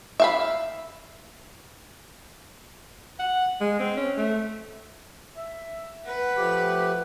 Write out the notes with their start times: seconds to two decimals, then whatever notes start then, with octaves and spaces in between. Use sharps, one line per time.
0.20 E5 F5 B5
3.19 F#5
3.60 G#3
3.79 C4
3.97 C#4
4.17 A3
5.37 E5
6.06 B4 F#5
6.37 F3 A3 G4